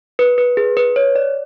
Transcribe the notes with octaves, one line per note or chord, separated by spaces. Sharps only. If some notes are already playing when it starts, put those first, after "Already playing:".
B4
B4
G#4
B4
C#5
D5